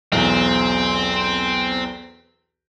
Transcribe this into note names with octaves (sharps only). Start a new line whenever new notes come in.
B1 E2 C4